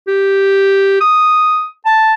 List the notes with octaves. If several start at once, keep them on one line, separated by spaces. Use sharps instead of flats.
G4
D#6
A5